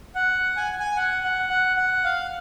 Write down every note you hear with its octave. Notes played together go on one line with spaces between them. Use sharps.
F#5
G#5
G#5
F#5
F#5
F#5
F#5
F5